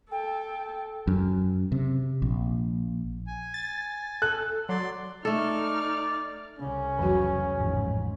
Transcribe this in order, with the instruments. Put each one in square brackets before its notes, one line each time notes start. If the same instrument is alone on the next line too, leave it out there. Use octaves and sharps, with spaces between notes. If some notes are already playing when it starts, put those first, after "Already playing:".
[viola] A4 [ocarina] G5
[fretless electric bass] F#2
C3
A#1
[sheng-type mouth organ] G#5
[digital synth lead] A6
[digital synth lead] A4 [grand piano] F#6
[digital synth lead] F#3 [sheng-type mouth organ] D5 C6
[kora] A3 A4 [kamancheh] D#4 F6 [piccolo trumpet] D5
[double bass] C2 C#3 [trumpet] C#4
[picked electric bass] F1 [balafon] E3 F#3 F#4
[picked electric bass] A1 F2 [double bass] G#2